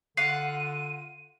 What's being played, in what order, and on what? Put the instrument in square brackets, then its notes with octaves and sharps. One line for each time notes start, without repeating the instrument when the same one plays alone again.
[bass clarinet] D3 [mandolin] F4 F#5 [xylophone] C7 [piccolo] D#7